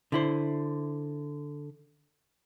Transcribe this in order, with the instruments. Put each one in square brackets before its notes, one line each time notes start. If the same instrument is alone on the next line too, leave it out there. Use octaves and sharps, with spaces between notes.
[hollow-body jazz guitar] D3 E4 C5